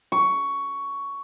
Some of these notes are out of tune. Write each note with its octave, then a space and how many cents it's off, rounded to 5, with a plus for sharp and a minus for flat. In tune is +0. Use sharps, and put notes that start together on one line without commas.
C#6 +10